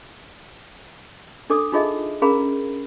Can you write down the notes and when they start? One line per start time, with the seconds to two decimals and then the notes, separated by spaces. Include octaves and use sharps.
1.50 D4 A4 D6 D#6
1.72 D4 D#4 F4 G#4 D#5 E5
2.22 C#4 G#4 A#4 F5 A#5 B5